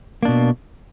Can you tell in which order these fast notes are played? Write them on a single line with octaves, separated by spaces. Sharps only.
A#3 D4 B2